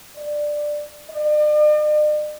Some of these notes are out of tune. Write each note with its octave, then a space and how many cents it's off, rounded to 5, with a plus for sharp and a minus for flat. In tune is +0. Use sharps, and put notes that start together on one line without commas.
D5 +10
D5 +45